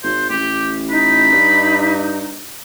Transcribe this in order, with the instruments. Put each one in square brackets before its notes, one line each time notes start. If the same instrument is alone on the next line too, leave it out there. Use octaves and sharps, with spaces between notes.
[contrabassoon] G#1 [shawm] C5
[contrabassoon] A1 [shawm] G4
[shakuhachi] D#4 [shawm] B5
[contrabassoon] G2